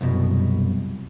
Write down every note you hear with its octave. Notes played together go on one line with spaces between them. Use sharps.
C2 F#2 B2